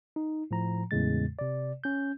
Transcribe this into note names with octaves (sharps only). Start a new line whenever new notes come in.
D#4
A2 F3 A#5
E2 A2 C#3 G#3 A6
C3 D5
C#4 G6